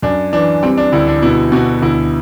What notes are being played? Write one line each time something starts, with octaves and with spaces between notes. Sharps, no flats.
F#2 D4
E3 D4
G3 C4
D4
D2 E4
D4
B2 E4
B2 F#4
D2 E4